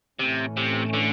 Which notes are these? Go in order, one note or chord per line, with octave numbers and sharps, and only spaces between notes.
A2 C3 E3 A3 C#4
C3
D3